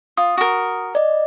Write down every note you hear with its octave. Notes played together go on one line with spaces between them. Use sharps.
F4 D#6
F#4 A#4
D5 D#5